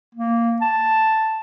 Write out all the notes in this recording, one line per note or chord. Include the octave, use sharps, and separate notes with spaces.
A#3
A5